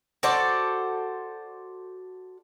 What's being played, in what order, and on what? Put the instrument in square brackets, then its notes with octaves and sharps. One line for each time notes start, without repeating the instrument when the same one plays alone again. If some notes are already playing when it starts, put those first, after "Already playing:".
[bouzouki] F#4 A4 C5 D5